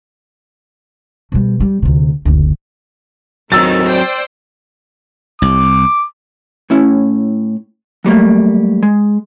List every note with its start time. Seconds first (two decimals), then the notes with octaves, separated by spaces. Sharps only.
1.32 B2 G3
1.60 G3
1.82 D2 C3
2.25 F#1 D2
3.52 D#3 F#3 C4 E6 A6
3.86 C5 D5 G5
5.42 C2 D6
6.70 A2 C#4 E4
8.04 F#3 G3 A3 A#3
8.83 G#3